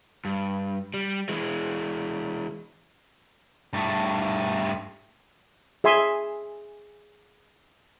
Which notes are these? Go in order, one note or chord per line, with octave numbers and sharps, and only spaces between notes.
G2
G3
E3 G#3
G2 A3
G#4 E5 G#5 C6